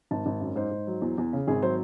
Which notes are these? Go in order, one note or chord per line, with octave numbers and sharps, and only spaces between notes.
G#1 A5
G#1
F#2
G#2 C5
G#2
F#3
E2
E2
C#3
G#1 G#4
F#3 C5